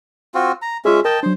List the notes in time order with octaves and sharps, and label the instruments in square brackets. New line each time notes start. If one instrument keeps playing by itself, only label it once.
[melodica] C4 F4 F#4
A#5
[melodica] G#3 C#4 E5 [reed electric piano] F4 G#4
[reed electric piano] A#4 [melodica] D#5 G5 A5
[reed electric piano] F#3 D4 [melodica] C5